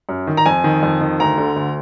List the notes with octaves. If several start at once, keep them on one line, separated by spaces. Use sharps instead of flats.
F#2
D#3
A#5
F2 G#5
D#3
F2
D#3
D2 A#5
D3
D2